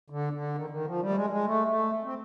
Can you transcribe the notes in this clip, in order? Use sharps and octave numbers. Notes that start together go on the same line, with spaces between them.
D3
D3
D#3
D#3
F3
G3
A3
G#3
G#3
A3
A3
C4